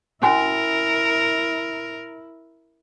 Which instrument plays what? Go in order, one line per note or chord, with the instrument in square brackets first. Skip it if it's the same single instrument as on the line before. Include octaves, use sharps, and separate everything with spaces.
[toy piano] C#4 F#4 G#5 [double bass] E4 [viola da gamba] A#4